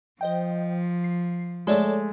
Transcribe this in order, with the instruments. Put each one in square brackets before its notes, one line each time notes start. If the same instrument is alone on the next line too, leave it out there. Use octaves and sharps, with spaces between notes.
[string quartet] F3 [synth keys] C5 D#5 G5
[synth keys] C7
[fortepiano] G#3 A3 [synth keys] A4 C#5 D5